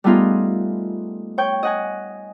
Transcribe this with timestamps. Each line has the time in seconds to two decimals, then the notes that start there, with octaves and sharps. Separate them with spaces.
0.04 G3 A3 B3 D#4 F4 G#4
1.38 C#5 G5 C#6 G6
1.63 D#5 F#5 G#5